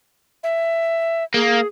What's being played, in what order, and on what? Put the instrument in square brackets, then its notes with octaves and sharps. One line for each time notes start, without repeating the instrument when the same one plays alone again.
[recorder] E5
[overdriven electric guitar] A#3 [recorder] G#4